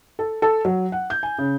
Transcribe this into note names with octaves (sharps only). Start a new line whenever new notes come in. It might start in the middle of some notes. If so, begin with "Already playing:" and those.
A4
A4
F#3
F#5
G6
G#5
C#3